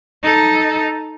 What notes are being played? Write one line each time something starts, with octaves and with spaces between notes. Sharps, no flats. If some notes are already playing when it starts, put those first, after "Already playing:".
D#4 A4